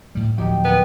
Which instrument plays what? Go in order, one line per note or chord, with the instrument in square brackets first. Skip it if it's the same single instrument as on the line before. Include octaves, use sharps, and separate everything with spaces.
[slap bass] A2 G3
[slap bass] D1 F3 F#3 [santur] D#4 G4 G5
[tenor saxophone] B3 [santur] A#4